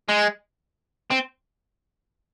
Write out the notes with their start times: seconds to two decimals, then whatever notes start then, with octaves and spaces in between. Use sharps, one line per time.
0.09 G#3
1.10 C4